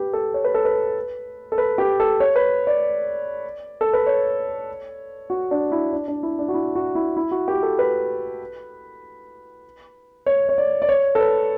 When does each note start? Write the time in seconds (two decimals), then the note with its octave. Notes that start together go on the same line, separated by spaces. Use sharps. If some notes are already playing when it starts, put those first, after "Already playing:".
Already playing: G4 B4
0.13 A4
0.34 C#5
0.44 B4
0.55 A4
0.65 B4
1.52 A4
1.58 B4
1.78 G4
2.00 A4
2.20 C#5
2.36 B4
2.67 D5
3.81 A4
3.93 B4
4.07 C#5
5.30 F#4
5.51 D4
5.72 E4
5.93 D4
6.08 D4
6.23 E4
6.39 D4
6.49 F#4
6.54 E4
6.75 F#4
6.95 E4
7.17 E4
7.31 F#4
7.48 G4
7.63 A4
7.79 B4
10.26 C#5
10.49 C#5
10.58 D5
10.82 D5
10.89 C#5
11.15 A4
11.20 B4